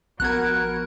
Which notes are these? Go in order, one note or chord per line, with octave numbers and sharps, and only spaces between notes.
A#1 B3 F#4 A#4 F#6 G#6